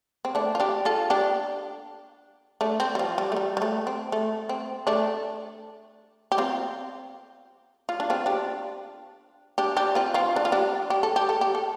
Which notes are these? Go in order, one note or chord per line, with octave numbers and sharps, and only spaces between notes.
C4
A3 D4
F4
D4 G4
F4 A4
D4 G4
A3 D4
C4
G3
F3
G3
A3
G3
G3
A3
C4
A3
C4
A3 D4
G4
C4 F4
F4
D4
C4 F4
D4 G4
D4 G4
D4 G4
C4 F4
C4 F4
D4
F4
D4 G4
G4
A4
G4
A4
G4
A4